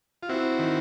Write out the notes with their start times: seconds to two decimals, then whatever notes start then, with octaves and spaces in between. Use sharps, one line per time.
0.23 F4
0.29 C4 E4 F#4
0.59 D#3